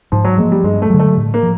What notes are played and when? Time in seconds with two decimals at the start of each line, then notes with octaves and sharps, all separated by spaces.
0.12 G#2 F3
0.25 F#3
0.38 F3 G#3 A#3
0.52 G3
0.64 G2 G#3
0.82 A3
0.90 D3 F#3
0.99 A3
1.17 A2
1.34 A#3
1.43 F3